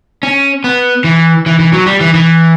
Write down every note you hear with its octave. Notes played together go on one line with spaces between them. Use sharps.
C#4
B3
E3
E3
E3
F#3
G3
E3
E3